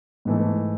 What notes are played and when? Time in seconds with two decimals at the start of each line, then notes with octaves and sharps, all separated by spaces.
0.25 G#2 E3 A3